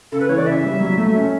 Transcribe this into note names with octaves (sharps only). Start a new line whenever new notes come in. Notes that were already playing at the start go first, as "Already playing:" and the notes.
C#3 A4
B4
E3 C#5
D5
C#3 E5
G3
F#3
A3
C#4